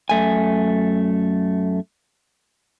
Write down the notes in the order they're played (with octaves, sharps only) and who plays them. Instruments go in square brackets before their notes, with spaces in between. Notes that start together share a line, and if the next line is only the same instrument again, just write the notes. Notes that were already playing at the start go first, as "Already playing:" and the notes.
[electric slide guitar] F#2 A3 G#5